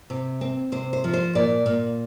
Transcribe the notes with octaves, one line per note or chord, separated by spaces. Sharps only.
C3
C4
C3 C5
C5
F3
C5
A#2 D5
A#2